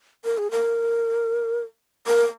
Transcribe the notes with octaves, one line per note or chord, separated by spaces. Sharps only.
A#4
G#4
A#4
A#4